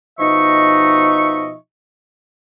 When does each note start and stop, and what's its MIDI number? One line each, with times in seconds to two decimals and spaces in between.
0.19 1.54 47
0.19 1.54 53
0.19 1.54 63
0.19 1.54 75
0.19 1.54 76
0.19 1.54 85